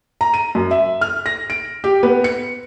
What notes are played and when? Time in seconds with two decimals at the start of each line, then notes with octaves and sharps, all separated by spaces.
0.21 A#5
0.34 D#7
0.55 F#2
0.71 E5
1.01 F6
1.26 A#6
1.50 D7
1.84 G4
2.03 B3
2.24 C#7